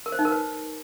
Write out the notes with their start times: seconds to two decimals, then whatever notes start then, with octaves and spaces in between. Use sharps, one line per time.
0.06 A#4
0.12 C5
0.19 D#4
0.25 A#4
0.32 B4